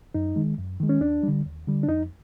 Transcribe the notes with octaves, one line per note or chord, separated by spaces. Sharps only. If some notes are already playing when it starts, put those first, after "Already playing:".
F#2 D#4
D#3 G#3
F#2
D#3 G#3
C#4
D#2 D4
D3 G3
D#2
D3 G3
D4
F2 D#4